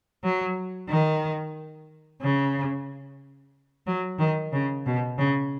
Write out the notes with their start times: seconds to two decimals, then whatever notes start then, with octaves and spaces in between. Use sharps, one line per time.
0.23 F#3
0.89 D#3
2.22 C#3
3.86 F#3
4.19 D#3
4.52 C#3
4.86 B2
5.18 C#3